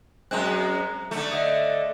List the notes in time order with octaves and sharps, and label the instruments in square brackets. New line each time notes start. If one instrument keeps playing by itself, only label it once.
[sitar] F#2 G#3 C4 [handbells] A#5 F#6
[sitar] D3 A3
[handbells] D#5 E5 D#6